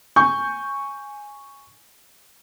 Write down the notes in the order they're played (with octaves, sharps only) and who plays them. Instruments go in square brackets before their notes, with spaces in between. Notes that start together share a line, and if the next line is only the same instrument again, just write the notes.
[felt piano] G#5 C#6 G6